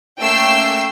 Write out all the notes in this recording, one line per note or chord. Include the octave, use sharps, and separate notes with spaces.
A3 A#3 C#4 G5 E6 C7